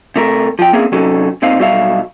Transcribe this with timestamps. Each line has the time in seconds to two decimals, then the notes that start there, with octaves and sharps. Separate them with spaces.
0.16 C3 A3 A#4
0.59 F3 G5
0.73 A#3 C4 C#4 E4 G#4 A#4
0.92 C3 F#3 C#4 D#4 F#4 A4
1.42 G2 A#2 C4 D#4 F5
1.59 B1 G3 F#4 B4 E5 F5